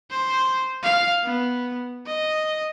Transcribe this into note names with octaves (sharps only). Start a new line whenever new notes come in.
C5
F5
B3
D#5